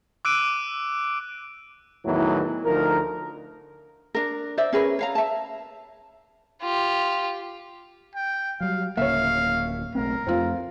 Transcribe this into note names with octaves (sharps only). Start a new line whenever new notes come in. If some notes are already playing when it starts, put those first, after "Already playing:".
D6 E6 F#6 D7 D#7
E2 A2 D#3 E3 F#3
D2 F3 D#4 A#4
D4 A#4
C5 D5 E5
C#4 G#4 A#4 B4
C#5 F5 A#5
E5 A5
F4 G4
G5
F#3 G3 F5
D1 C#3 A#3 C#5 E5 F5
B1 A3 C4 A#4
F2 A3 C4 F4